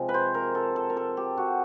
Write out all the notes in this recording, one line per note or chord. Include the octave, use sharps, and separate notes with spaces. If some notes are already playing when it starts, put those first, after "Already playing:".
Already playing: C3 F3 G#3
B4
C5
A#4
A4
A4
A#4
A4
G4
F#4